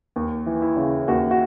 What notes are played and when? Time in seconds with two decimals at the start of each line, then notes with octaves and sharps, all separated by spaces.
0.16 D#2
0.46 E3
0.62 E4
0.76 C#3
1.08 D#2 F#4
1.31 F#4